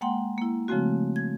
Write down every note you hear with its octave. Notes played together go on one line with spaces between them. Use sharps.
G#3 A#3 F#5 G5 C6
A#3 E4
C#3 F3 G#3 A3 C4 F#4
G#6